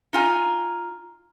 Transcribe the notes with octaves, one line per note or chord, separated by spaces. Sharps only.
D#4 F4 G#5